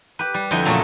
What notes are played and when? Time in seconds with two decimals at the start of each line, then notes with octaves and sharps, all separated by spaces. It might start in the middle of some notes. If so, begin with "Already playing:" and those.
0.19 G4 B4
0.34 G3
0.51 F2 D3 E4 D#5 G5
0.65 A#2 C#3 F#3 A3